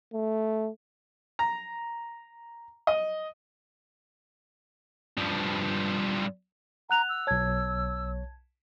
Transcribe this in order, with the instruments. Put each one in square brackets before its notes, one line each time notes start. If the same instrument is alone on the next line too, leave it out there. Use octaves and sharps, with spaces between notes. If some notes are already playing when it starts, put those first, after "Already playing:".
[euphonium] A3
[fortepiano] A#5
D#5
[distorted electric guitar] G2 F3
[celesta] F#5 F#6 F7 [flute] A#5
[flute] E6
[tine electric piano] B1 C#5 [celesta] A5 G#6